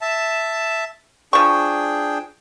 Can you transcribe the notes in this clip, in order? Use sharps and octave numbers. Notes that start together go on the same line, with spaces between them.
E5 A5
F3 D4 G#4 G5 C#6